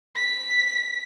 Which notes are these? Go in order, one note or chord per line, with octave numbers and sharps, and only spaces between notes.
B6